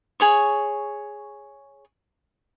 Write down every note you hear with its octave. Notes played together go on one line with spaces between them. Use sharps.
G#4 C#5 C#6